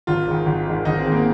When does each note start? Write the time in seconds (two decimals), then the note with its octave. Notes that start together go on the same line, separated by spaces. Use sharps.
0.07 G#1 F4
0.28 G#2 D#3
0.46 G#1
0.67 G#2 D#3
0.85 G#1 D#4
0.99 C4
1.06 G#2 D#3
1.12 A#3